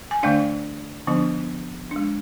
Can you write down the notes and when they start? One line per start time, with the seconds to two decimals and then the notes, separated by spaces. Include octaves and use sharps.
0.11 G#5
0.23 D3 A3 D4 D5 F5
1.07 D3 F3 B3 D4
1.91 G#3 D4